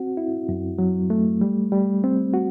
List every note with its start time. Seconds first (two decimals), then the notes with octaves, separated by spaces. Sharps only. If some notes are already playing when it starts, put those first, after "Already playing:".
Already playing: C4 F#4
0.17 E4
0.49 F#2
0.79 F#3
1.10 A3
1.41 G3
1.72 G3
2.04 C4
2.34 F#4